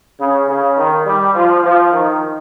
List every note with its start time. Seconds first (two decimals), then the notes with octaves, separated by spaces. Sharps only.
0.20 C#3
0.48 C#3
0.77 D#3
1.05 G3
1.34 F3
1.63 F3
1.91 D#3